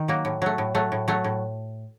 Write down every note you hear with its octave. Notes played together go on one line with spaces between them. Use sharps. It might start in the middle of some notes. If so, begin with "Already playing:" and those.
Already playing: D#3
F#3 A#3
A2
F#3 A3
A2
F#3 A3
A2
F#3 A3
A2